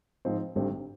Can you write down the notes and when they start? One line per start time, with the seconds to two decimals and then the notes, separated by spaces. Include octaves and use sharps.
0.25 G#2 F3 C4 D#4
0.55 G#1 G2 D3 G3 C4